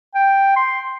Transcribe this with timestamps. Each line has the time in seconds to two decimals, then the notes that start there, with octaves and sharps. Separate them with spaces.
0.15 G5
0.56 C6